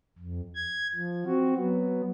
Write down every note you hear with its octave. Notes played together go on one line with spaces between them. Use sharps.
F2
G#6
F3
C4 F#4
F#3 B3